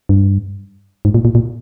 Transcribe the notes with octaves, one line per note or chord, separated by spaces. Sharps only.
G2
G#2
A#2
A#2
A#2